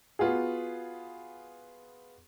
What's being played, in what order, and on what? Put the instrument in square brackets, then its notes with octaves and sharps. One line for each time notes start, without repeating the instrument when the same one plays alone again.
[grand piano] B3 F4 F#4 G#4